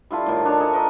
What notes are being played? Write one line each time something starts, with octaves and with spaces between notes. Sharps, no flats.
G3 E4 F4 A4
A2 D#3 F4
D4 C#5
A4 D#5 G#5
A#4 B4 D5 D#5